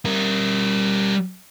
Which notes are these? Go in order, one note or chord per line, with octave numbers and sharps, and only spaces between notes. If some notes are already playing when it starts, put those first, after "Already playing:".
G3 A#4